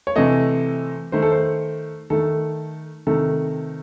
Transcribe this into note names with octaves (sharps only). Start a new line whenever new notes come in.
C#5
C3 E3 A3 D#5
D#3 A3 C5
A4
C5
D#3 A3 A4
C3 D#3 A3 A4